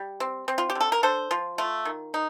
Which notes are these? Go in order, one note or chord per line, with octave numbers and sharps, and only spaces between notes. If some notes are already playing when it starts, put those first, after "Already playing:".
Already playing: G3
C4
C4
F4
G4
D3
A4
A#4
D4 A4 C5
F3 F4
A3 F4
D#3
D#4